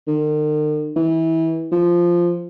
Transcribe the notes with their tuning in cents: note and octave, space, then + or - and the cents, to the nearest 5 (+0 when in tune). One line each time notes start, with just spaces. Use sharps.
D#3 -45
E3 -25
F3 -5